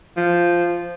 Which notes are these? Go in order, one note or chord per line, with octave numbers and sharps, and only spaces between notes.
F3